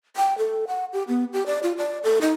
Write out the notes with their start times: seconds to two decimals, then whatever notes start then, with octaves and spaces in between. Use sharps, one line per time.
0.17 G5
0.38 A4
0.68 F#5
0.93 G4
1.08 B3
1.33 G4
1.46 D5
1.63 F4
1.78 D5
2.04 A4
2.21 D#4